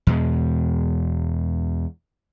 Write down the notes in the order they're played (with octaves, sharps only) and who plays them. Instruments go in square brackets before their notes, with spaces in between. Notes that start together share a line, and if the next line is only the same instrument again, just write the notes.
[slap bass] E2 B2 G#3